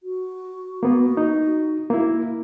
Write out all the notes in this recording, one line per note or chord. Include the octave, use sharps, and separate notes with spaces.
F#4
A#3 B3
D#4
A#3 E4